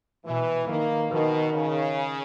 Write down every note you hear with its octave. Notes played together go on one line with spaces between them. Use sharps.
B2 E3
D#3 A#3
B2 D#3
C#3